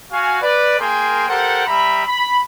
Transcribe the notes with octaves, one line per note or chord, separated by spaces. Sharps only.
F#4 F5 G#5
B4 D5
A#3 G#4 A#4 G5 G#5 C6
G4 A4 A#4 C5 F#5
G3 E5 A#5 B5
B5